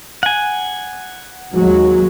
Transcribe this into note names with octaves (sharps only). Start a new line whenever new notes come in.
F#5 G#5
D#2 F#3 G#3